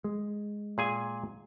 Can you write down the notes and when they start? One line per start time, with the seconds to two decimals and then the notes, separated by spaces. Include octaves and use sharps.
0.04 G#3
0.78 A#2 G#4 G#5